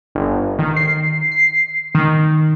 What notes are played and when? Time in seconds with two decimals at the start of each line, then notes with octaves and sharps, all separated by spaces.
0.15 G1
0.59 D#3
0.76 C7
1.32 C7
1.95 D#3